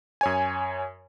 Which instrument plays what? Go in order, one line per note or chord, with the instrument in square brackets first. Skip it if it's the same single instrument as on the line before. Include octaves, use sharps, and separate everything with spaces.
[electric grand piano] F#2 C#5 G#5